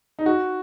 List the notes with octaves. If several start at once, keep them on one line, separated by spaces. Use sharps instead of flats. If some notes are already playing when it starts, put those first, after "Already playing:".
D#4
F#4